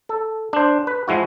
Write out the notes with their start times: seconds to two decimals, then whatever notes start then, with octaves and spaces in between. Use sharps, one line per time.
0.09 A4
0.53 D4 C5
0.87 B4
1.08 F3 G#3 E4 F#4